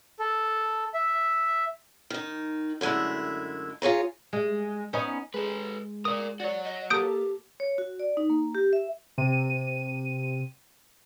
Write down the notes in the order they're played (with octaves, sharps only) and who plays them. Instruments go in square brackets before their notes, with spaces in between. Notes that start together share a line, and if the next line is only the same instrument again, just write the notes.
[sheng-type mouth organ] A4
E5
[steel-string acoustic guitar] D#3 D#4
F#2 D3 G#3 A3 E4
F4 G#4 C#5 A#5
[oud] G#3
B3 C#4 D#4
[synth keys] G#3 [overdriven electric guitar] A4 B4
[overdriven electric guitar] A#4 D5 [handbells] D#6
[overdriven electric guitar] F#4 C#5 [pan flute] D5
[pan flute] D#5
[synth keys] A#3 A4 [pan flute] G4 [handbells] D#6 G6 D7
[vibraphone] C#5
F#4
D5
D#4
A#3
G4
E5
[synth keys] C3 D#7